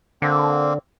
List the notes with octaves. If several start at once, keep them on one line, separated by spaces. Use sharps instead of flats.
D3 A#3 C4